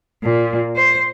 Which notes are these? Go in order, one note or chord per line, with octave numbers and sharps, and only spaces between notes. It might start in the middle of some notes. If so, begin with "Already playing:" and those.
A#2
C5